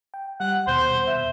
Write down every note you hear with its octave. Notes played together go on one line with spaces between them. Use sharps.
G5
G3 F#5
D#2 B2 C5
E5